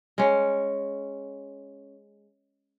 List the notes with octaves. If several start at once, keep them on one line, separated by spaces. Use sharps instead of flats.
G#3 C#4